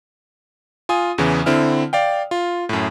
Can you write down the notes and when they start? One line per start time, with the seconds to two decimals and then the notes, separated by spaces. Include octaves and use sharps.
0.89 F4 G#5 D#6
1.18 E2 C#3 E3
1.46 D3 C4 E4 F6
1.93 D5 F5 G5
2.31 F4
2.69 F#2 A2